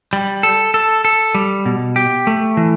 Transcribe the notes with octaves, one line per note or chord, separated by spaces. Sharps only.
G3
A4
A4
A4
G3
B2
G4
A3
E3